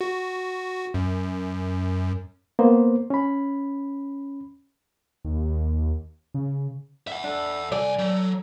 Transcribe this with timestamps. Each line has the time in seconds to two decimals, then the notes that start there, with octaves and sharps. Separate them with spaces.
0.01 F#4
0.94 F#2
2.59 A#3 B3 C5
3.10 C#4 B5
5.25 D#2
6.34 C#3
7.07 E5 F#5
7.24 D4 A4
7.72 C2 D5 G#5
7.99 F#3 A4